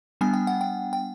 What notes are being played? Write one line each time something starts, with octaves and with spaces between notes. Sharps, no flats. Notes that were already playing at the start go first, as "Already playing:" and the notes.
G3 B3 D4 G#5
G5
F#5
G5
G5